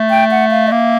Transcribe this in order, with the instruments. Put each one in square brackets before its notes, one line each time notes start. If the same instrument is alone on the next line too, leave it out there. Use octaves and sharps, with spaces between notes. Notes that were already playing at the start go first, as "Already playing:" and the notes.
Already playing: [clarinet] A3
[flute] G5
F#5
F5
D#5
[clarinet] A#3 [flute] E5